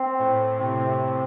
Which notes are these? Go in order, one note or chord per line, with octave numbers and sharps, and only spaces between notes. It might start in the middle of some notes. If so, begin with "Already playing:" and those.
Already playing: C4
A2
C3 C4